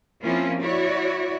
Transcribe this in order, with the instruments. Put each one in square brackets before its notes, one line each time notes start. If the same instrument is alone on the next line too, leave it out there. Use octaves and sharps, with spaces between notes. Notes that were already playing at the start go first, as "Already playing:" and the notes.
[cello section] F3 A#3 C4 C#4 E4 F4
E4 F#4 C#5 D5